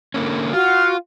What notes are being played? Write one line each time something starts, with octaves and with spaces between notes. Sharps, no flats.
D3 A#3 C#4
F4 F#4 F5